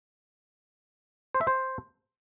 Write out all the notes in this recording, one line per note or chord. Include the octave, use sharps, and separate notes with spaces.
C5
E5
C5